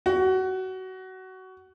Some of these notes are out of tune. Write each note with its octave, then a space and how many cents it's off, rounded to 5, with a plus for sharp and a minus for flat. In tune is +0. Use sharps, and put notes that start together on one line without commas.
F#4 +20